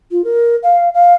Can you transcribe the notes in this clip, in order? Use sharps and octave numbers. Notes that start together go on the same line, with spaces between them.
F4
A#4
F5
F5